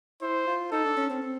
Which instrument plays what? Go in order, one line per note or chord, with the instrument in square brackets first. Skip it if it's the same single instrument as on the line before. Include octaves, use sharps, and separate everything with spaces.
[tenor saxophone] E4 [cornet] C5
[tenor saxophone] F4
[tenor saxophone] D#4 [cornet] A4
[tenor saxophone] D4
C#4
C4
C4